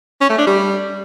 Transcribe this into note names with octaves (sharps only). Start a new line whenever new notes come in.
C#4
A3
D4
G3